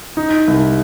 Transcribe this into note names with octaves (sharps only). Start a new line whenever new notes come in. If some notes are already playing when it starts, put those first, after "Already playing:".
D#4
C2